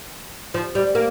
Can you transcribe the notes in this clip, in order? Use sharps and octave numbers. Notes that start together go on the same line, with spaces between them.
F3
G3
A#3